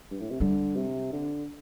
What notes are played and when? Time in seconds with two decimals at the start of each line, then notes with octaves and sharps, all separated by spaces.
0.11 G2
0.20 A2
0.31 C3
0.40 D3 G3
0.76 C3
1.13 D3